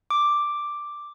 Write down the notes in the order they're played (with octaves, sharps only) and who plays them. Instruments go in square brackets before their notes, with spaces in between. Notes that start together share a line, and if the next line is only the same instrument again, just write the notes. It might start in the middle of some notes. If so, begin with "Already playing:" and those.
[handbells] D6